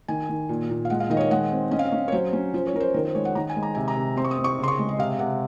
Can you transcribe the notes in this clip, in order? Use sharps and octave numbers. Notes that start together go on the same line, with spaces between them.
D#3 G#5
D#3
A#2
A#2
F5
G#3 F#5
F5
D#3 D#5
C#5
D#5
G#3 F#5
C4
C#4 D#5
F5
D#5
C#4
C#5
F#3 C5
C#4
F3 C5
C#5
F3 A#4
C5
D#3 A#4
C5
G#3 C#5
F#5
D#3 A#5
G#5
G#3
A#5
C3 G#5
A#5
C3
C4 C6
C#6
D#6
C4
C#6
C#3 C6
C#6
G#3 D#5
D#5
C3 F5
C3 F#5